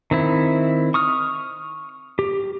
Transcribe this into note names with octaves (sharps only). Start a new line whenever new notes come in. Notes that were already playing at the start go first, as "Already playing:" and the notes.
D#3 C4 E4
C#6 D#6 F6
G4